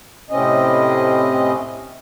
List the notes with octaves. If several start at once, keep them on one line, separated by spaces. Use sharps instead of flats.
A2 C3 C4 C#4 D#5